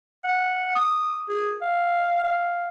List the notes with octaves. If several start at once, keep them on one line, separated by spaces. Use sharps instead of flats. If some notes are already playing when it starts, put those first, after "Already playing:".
F#5
D#6
G#4
F5
F5